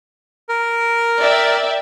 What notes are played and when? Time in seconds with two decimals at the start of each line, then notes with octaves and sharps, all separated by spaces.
0.49 A#4
1.18 D5 E5 G5